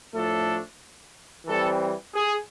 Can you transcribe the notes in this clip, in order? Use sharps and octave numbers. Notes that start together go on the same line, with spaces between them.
A2 F3 A3 D4 A4
E3 G3 C4 A4
G#4